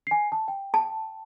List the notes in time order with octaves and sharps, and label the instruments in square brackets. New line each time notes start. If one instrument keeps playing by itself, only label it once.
[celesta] G#5 C7
A5
G5
[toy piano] A5